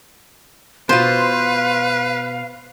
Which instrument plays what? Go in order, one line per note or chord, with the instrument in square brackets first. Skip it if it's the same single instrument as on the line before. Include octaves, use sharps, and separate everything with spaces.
[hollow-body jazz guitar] B2 F4 [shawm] B4 [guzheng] C5 [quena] F5